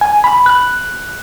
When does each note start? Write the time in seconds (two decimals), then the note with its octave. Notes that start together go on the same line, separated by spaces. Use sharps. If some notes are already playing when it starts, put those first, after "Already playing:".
0.01 G#5
0.24 B5
0.46 F#6